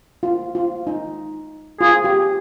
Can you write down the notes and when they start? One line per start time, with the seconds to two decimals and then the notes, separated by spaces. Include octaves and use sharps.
0.23 F4
0.55 F4
0.87 D#4
1.81 F4 G#4
2.04 G4